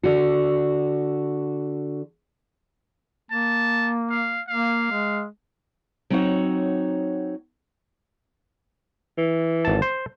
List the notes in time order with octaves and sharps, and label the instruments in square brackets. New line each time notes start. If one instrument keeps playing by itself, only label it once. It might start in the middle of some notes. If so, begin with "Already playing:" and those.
[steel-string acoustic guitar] D3 F#4
[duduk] A#3 [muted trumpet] A5
[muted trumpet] F5
[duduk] A#3 [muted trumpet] F5
[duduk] G#3
[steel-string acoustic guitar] F#3 C4 D#4 F#4 C#5 F#5
[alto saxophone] E3
[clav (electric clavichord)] G#1 A5
C5